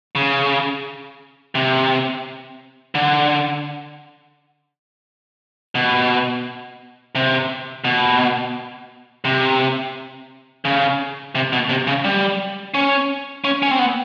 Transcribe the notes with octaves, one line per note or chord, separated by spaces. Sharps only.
C#3
C3
D3
B2
C3
B2
C3
C#3
C3
B2
C3
C#3
G3
C#4
C#4
C#4
C4
B3